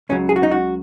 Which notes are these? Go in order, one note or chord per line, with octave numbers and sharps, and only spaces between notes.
C#2 C#3 F#3 C#4
G#4
F#4
D#4
F#4